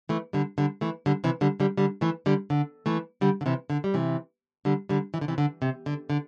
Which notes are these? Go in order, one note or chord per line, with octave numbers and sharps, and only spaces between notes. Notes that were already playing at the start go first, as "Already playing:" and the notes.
E3 A3
D3 G3
D3 G3
E3 A3
D3 G3
C3 E3
D3 G3
D3 G3
D3 G3
E3 A3
D3 G3
D3
E3 A3
D3 G3
D3
C3 E3
D3
G3
C3 E3
D3 G3
D3 G3
E3
D3
C3 E3
D3
C3
D3
D3